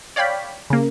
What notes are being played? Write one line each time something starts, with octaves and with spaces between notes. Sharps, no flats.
C#5 D5 F5 G5 B5
C#3 A#3